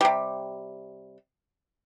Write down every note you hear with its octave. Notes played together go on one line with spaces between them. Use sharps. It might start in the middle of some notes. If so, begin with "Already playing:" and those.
C3 G3